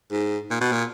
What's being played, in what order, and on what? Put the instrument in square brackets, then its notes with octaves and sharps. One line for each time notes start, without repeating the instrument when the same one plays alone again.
[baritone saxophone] G#2
A#2
B2
A#2